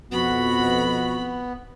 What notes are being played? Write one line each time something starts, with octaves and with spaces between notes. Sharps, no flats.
F2 B2 B3 F#4 B5